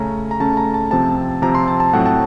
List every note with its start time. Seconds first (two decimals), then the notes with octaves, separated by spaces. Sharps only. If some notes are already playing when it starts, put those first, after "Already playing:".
Already playing: C#3 A3 C#4 A#5
0.31 A#5
0.40 C#3 A3 C#4 A5
0.57 A#5
0.74 A5
0.91 C3 F3 C4 A5
1.42 C3 F3 C4 A#5
1.55 C6
1.68 A5
1.80 A5
1.93 A2 F#3 A3 C4 F#5
2.06 A5